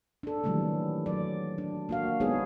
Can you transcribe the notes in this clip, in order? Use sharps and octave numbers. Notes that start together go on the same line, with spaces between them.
D4 A4
D#3 E3 F#3 G3 A3 A#3
F#3 D5
D4
A#3 F#4 F5
G#3 B3 D#4 G#4 C#5